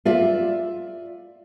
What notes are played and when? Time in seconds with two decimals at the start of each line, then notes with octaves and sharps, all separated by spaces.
0.05 F4 D5 E5